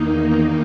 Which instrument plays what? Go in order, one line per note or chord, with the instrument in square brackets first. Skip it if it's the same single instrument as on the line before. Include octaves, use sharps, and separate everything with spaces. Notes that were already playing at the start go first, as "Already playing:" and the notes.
Already playing: [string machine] E2 D#3 A#3 D#4